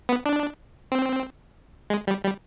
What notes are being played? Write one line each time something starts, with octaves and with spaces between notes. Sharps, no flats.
B3
D4
C4
G#3
G3
G3